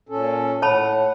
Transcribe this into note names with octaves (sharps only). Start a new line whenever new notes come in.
A#2 C#4 A4
A2 C#5 F#5 A5 B5